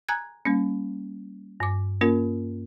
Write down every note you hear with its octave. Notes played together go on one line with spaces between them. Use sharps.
G#5 A#5 F#6 G#6
G3 A#3 C#4
G2 D6
A#3 C#4 F4 A#4